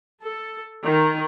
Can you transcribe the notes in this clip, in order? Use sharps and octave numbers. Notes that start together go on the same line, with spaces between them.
A4
D#3